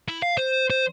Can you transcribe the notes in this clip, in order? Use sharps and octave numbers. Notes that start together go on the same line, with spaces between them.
E4
F5
C5
C5